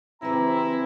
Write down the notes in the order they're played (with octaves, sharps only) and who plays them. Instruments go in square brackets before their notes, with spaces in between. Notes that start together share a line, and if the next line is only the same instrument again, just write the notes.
[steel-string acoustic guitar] C#3 E3 B4 [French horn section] C4 [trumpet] E4 [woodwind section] G4 G#5 A#5